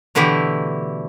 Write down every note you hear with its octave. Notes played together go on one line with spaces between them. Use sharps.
B2 D3 E3 A3 E4 G4